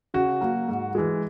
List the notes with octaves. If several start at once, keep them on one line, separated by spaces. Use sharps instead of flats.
C#3 F#4
F#3 A#3
G#2
E3 G#3